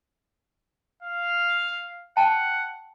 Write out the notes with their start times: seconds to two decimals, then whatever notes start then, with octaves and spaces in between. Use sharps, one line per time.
1.02 F5
2.17 F#5 G5 A5